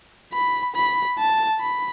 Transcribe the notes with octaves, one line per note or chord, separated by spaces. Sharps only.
B5
B5
A5
B5